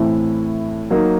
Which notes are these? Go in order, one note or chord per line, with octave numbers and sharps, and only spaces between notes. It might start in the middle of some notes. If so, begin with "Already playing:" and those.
Already playing: A2 E3 A3 C4 E4
F#3 A#3 D#4